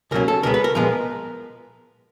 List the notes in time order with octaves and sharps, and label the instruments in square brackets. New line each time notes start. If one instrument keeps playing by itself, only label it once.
[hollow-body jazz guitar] C#2 B2 F#3 A#3 C#4 A#4
A4
C#2 B2 G#3 B3 A#4
B4
A#4
A#2 F3 G#3 B3 A#4